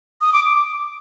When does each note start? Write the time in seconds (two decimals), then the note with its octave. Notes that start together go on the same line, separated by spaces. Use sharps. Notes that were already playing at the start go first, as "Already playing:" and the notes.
0.21 D#6
0.33 D6